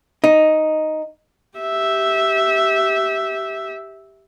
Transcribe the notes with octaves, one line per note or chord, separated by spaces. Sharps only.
D#4
G4 E5